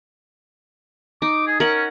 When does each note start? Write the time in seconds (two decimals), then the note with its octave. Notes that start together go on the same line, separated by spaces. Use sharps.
1.22 D#4 D6
1.47 G#4
1.60 C#4 A#4 F#5